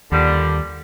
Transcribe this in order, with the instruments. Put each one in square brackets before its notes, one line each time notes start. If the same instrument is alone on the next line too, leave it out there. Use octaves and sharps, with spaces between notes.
[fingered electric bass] D#2 [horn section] A#2 D3 G3